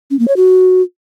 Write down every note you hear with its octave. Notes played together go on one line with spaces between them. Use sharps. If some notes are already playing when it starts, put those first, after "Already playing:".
C#4
A#3
C#5
F#4